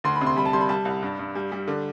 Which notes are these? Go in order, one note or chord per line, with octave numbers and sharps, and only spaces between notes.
D2 C6
B5
C3
C6
G3 B5
A5
G3 C6
B5
G3 A5
C2
G2
G2
G3
G3
D3